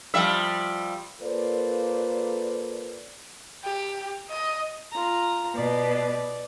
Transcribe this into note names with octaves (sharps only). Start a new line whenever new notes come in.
F3 G3 E5
A#3 F4 A4 B4 C5 D5
G4
D#5
F4 A#5
B2 D5